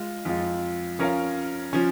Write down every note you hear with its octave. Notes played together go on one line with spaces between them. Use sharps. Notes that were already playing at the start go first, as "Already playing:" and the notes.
Already playing: G#3 F4
F2 F3 G#3 F4
F3 C#4 A#4 C#5 F5
F3 C#4